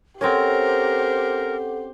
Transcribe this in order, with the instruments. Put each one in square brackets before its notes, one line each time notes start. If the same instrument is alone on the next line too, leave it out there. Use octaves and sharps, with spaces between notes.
[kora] C4 C#4 [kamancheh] G4 C5 [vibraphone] A4 F#5 D6 [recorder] A#4